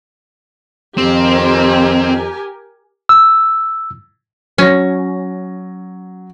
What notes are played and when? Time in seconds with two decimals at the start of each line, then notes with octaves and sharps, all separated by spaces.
0.98 F2 D#3 C4 G4 A#4 G#5
3.09 E6
4.58 F#3 C#4 A#6